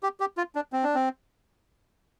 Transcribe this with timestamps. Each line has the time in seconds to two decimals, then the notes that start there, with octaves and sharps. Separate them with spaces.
0.03 G4
0.20 G4
0.37 F4
0.55 D4
0.73 C4
0.84 D4
0.95 C4